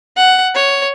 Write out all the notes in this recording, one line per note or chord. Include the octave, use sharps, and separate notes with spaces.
F#5
C#5